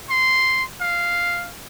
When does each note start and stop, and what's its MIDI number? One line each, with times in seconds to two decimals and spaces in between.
0.10 0.64 84
0.81 1.50 77